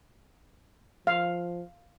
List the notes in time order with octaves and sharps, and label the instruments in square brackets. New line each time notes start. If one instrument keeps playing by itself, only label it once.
[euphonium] F3 [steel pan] F5